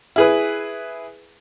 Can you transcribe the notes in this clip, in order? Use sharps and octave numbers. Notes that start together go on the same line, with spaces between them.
E4 G#4 B4